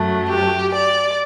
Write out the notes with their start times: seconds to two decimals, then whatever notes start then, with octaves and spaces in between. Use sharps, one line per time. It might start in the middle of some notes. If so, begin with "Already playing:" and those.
Already playing: F#2 F#3 A3
0.28 G4
0.73 D5